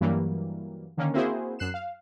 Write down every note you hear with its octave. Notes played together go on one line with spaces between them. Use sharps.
G2 E3 F#3 G3 A#3
D3 D#3 A#3 C#4
A#3 C4 E4 F#4 G#4 C5
F#2 F#6 C7 E7
F5